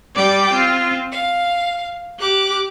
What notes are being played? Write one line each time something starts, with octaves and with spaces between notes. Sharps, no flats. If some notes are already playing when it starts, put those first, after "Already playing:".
G3 D5 G5 D6
C4 F4
F5
G4 D6 F#6